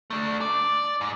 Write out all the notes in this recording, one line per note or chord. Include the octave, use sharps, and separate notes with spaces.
A3 D4
D5
G#2